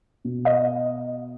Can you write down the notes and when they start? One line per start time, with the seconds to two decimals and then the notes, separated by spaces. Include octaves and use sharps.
0.25 B2
0.45 D#5